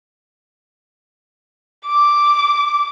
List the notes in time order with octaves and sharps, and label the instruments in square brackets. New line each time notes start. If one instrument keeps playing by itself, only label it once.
[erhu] D6